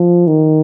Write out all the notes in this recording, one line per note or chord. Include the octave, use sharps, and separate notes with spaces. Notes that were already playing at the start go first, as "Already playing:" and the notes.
Already playing: F3
D#3